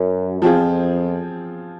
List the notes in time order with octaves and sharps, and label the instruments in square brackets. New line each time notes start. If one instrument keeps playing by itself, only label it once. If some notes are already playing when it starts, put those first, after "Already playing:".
Already playing: [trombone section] F#2
[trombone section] F2 [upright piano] F3 C4 F4 G#4